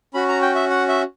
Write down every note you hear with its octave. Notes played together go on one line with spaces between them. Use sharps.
C#4 F#4 B5
A#5
G5
E5
F#5
E5